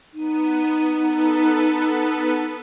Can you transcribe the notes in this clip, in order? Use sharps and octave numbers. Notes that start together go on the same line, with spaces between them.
B3 D#4 D#7
B3 A4 B4